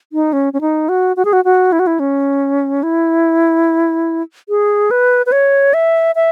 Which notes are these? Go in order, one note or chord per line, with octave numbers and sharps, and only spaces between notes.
D#4
C#4
C#4
D#4
F#4
F#4
G#4
F#4
F#4
E4
F#4
E4
C#4
E4
G#4
B4
B4
C#5
E5
E5